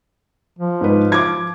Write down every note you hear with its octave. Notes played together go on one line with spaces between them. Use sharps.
F3
G#2 B4
D6 G#6